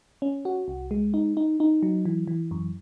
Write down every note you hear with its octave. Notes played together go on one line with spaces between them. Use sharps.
C#4
F#4
C2
G#3
D#4
D#4
D#4
F#3
E3
E3
F#2